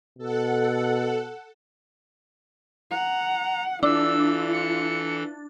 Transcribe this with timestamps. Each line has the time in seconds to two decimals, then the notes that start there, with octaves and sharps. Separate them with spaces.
0.18 B2 A4 F#5
2.91 F#5 A#5
3.83 E3 D4 E4 F4 A4 E6
4.52 C#7